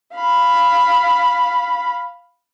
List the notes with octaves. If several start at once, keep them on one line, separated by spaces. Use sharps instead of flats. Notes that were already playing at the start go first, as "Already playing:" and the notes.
F5 B5